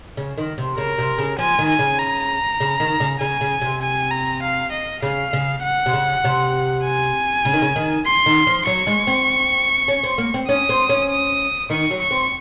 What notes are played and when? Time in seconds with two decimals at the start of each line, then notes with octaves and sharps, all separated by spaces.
0.17 C#3
0.38 D#3
0.58 C3
0.77 C#3 A#4
0.98 C3
1.18 C#3
1.38 F3 G#5
1.59 D#3
1.69 G#5
1.79 C#3
1.99 A#5
2.60 C#3
2.80 D#3
3.00 C#3
3.20 C#3 G#5
3.41 C#3
3.62 C3
3.82 G#5
4.11 A#5
4.42 F5
4.72 D#5
5.02 C#3 F5
5.33 C#3
5.63 F#5
5.86 C3
5.93 C#3
6.24 C3
6.85 G#5
7.45 C#3
7.53 D#3
7.62 C#3
7.76 D#3
8.07 C6
8.26 D#3
8.47 F3
8.67 F#3 C#6
8.87 G#3
9.07 C4
9.88 C#4
10.03 C4
10.18 A#3
10.34 C4
10.48 C#4 D#6
10.69 C4
10.89 C#4
11.10 D#6
11.70 D#3 C#6
11.91 F#3
12.01 C#6
12.11 C4